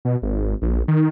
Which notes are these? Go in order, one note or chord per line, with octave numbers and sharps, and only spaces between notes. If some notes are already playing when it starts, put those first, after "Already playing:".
B2
G#1
A#1
D#3